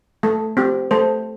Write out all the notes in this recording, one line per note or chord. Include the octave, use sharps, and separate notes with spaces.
A3 A4
C4 G4
A3 A4 C5